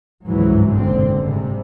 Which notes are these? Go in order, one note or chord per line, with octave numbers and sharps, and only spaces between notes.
G1 C#2 G#2 E3 F#3
F#1 B1 G#2 D3 C4
G#2 C3 G3 G#3